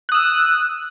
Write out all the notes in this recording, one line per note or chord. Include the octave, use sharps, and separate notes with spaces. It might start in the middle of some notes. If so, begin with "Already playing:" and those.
D#6 E6 F#6